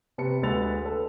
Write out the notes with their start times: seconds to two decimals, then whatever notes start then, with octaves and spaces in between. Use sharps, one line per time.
0.18 C3 B4 A5 C#7
0.42 D2 G#3 B4 E6 A6 F7
0.85 A4 B4 A5